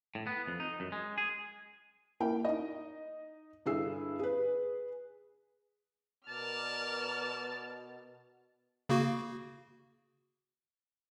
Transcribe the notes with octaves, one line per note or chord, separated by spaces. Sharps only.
A2
B3
F2
D#4
F#2
G#3
G#4
A#3 E4 G5
D#4 D#5
G2 D3 E4 G#4 E6 C7
G#4 B4
B2 A#4 D5 A5 F6
C#3 A#3 F#4